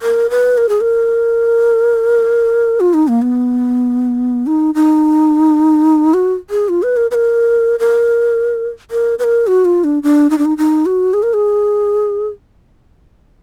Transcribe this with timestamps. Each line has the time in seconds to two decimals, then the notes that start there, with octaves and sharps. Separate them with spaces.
0.02 A#4
0.30 B4
0.58 A#4
0.69 G#4
0.81 A#4
2.80 F4
2.94 D#4
3.08 A#3
3.22 B3
4.47 D#4
4.75 D#4
6.14 F#4
6.50 G#4
6.69 F4
6.83 B4
6.97 A#4
7.11 B4
7.15 A#4
7.80 A#4
8.91 A#4
9.19 B4
9.24 A#4
9.47 F#4
9.65 F4
9.84 D4
10.03 D4
10.30 D#4
10.38 D4
10.45 D#4
10.58 D#4
10.86 F#4
11.14 G#4
11.23 A#4
11.34 G#4